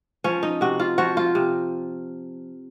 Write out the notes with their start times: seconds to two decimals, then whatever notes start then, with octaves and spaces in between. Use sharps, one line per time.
0.24 F3 C#4
0.43 D#4
0.61 C3 F#4
0.80 F4
0.98 F3 F#4
1.17 F4
1.35 C3